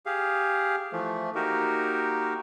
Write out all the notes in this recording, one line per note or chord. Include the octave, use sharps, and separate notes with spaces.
G4 G#4 F5
E3 F3 A3
A#3 D#4 F#4 G4 A#4